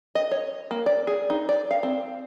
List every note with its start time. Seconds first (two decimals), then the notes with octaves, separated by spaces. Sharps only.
0.15 D#5
0.31 C#5
0.71 A#3
0.86 D5
1.07 G#4
1.30 D#4
1.49 D5
1.71 F5
1.83 C4